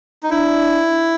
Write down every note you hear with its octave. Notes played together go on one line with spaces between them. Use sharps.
D#4
D4 E4